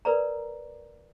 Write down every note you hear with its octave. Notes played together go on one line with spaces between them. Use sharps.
A#4 B4 D5 A#5